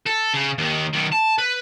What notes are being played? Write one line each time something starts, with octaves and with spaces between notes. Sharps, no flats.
A4
C#3
D#2 D#3
B1 D#3
A5
B4